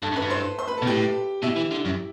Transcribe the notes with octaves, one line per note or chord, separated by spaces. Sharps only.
G2 A4 A5
F#2
B4 B5
G2
C5 C6
C5 C6
B4 B5
A4 A5
B2
A2 G4 G5
B2 E4 E5
E3
D3
F#2